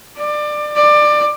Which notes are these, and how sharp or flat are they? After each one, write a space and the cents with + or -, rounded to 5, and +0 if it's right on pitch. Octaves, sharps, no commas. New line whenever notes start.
D5 +25
D5 +20